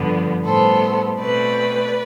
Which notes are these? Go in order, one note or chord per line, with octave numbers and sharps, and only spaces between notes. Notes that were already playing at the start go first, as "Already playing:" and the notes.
Already playing: G2 D3 F3 B3
A2 G3 B3 A4 C5
B2 A3 C4 B4 D5